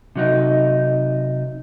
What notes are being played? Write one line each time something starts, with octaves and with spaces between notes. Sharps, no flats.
C3 F#3 D#4